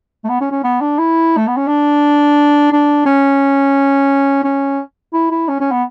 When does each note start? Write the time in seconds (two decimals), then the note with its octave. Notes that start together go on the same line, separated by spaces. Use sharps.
0.24 A3
0.29 B3
0.41 C#4
0.51 C#4
0.64 B3
0.81 D4
0.98 E4
1.37 A3
1.47 B3
1.57 C#4
1.67 D4
2.72 D4
3.06 C#4
4.44 C#4
5.13 E4
5.31 E4
5.48 C#4
5.60 C#4
5.71 B3